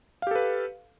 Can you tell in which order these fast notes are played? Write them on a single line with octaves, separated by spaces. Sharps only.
F5 G4 A4 B4